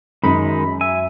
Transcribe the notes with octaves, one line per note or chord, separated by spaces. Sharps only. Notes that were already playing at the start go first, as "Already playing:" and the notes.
F#2 D#3 G#3 D#4 B5
E5 G#5